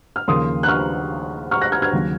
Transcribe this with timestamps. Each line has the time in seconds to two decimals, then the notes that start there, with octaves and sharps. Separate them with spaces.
0.16 F6
0.28 D#2 C#3 F3 A#3 C6 D#6
0.63 F#6
0.68 C#6 F6
1.51 C#6 F6
1.61 F#6 A#6
1.72 F6 G#6
1.82 F6 G#6
1.93 D#2 C#3 F#3 C#4